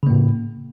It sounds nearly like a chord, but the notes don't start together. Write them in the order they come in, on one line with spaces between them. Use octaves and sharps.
C#3 A#3 A2